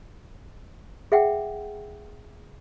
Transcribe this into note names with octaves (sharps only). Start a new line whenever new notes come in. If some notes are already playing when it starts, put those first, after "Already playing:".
G#4 E5 F#5 G5